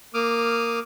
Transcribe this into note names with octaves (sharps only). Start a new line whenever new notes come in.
A#3 D6 D#6 F6